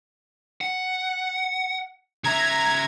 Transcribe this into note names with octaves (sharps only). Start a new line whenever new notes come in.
F#5
C#3 E5 A#5 G#6